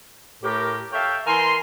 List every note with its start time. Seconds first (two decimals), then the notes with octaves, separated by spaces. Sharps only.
0.43 A2 G4 A#4
0.92 A4 C#5 E5 F5 G5
1.27 E3 A#4 G#5 C6